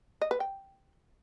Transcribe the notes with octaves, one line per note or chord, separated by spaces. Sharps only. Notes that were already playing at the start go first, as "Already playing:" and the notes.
D#5
B4
G5